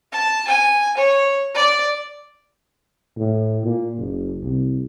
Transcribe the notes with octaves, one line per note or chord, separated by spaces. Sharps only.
A5
G#5
C#5
D5
A2
A#2
F#1
C2